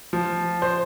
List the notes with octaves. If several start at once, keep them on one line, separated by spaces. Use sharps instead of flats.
F3
C5